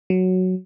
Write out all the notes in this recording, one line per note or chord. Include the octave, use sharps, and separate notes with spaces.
F#3